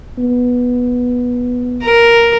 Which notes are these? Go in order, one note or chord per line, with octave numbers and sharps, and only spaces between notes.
B3
A#4